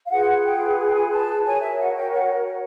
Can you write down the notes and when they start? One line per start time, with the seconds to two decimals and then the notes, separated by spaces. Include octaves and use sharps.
0.05 F5
0.10 F4 G#4 B4 F#5
0.44 G5
0.77 G#5
0.85 G5
0.94 G#5
1.11 A5
1.44 F#4 A#4 C#5 G#5
1.61 E5
1.78 F#5
1.94 G5
2.11 F#5